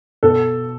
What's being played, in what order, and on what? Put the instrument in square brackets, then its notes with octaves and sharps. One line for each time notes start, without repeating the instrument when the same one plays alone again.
[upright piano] B2 A4